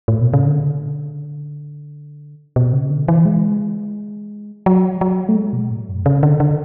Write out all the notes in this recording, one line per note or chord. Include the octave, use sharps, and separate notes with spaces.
A2
B2
C#3
D3
B2
C#3
D3
E3
G#3
F#3
F#3
A3
G#3
B2
A2
F#2
C#3
D3
D3